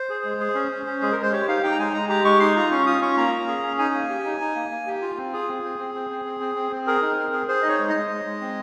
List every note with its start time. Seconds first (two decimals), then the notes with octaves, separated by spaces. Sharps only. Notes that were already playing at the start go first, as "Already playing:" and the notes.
Already playing: C5
0.09 G#4
0.24 G#3
0.40 G#4
0.55 C#4
0.71 C#4
0.86 C#4
1.02 G#3 G#4
1.12 A#4
1.18 G#3 C5
1.32 G4 C#5
1.48 D#4 F5
1.63 D#4 G5
1.72 A#5
1.79 G#3 G#5
1.94 G#3 A#5
2.09 G4 A#5
2.24 G#3 C#6
2.40 D#4 C6
2.56 F4 A#5
2.71 C#4 C#6
2.86 F4 D#6
3.01 C#4 C#6
3.17 A#3 A#5
3.32 C#4
3.48 G#4
3.63 C#4
3.78 D#4 G#5
3.94 A#3
4.09 G4
4.25 D#4
4.40 D#4
4.55 A#3
4.71 A#3
4.87 G4
5.02 F4
5.17 C4
5.33 F4 G#4
5.48 C4
5.63 C4
5.79 C4
5.94 C4
6.10 C4
6.25 C4
6.40 C4
6.55 C4
6.71 C4
6.87 G#4 A#4
7.02 D#4
7.18 C4
7.33 G#4
7.48 G#4 C5
7.62 D#4 D#5
7.68 C#5
7.79 G#3
7.90 G#3 D#5
8.10 G#3
8.25 G#3
8.41 C4